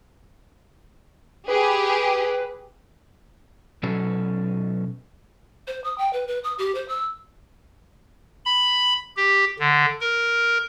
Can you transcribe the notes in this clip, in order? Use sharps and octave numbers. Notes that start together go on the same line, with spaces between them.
G4 G#4 B4
B2 F#3 C#4 A4
C5
D#6
G5
B4
B4
D#6
G4
C5
E6
B5
G4
D3
A#4